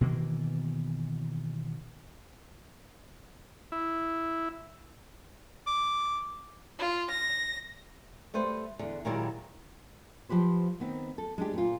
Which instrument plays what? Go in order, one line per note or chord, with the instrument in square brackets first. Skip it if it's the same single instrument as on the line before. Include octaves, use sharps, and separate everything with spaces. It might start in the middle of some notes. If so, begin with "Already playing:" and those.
[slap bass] B2 D#3 E3 A#3
[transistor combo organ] E4
[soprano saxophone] D6
[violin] F4
A#6
[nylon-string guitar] G3 A3 B4 C5
E2 D3
A#2 D#3 F#3 G#3 E4 G4
F3 G4 B4 C5
D#3 B3 C4
A4
G#3 D4 G4
A#2 F4